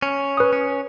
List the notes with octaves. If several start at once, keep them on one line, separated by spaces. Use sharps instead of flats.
C#4
B4 D#6
C#4